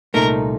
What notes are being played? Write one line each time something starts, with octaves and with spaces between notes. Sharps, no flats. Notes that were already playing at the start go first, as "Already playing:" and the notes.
C2 A#2 A3 D#4 A#4